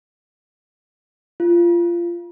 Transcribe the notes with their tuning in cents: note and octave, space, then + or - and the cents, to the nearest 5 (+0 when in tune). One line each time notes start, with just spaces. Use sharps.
F4 -20